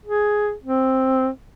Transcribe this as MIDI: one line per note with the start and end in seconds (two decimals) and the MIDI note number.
0.05 0.53 68
0.64 1.29 60